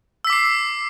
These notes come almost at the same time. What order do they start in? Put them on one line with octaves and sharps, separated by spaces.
E6 B6 D6 C7